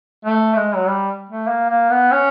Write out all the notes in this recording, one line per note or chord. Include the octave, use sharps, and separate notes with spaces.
A3
G#3
F#3
G3
A3
A#3
A#3
B3
C#4